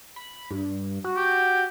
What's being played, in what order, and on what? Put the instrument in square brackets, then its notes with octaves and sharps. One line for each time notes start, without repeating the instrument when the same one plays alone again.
[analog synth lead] B5
G2
F#4
[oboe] G4